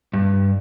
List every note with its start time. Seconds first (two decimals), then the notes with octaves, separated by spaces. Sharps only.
0.13 G2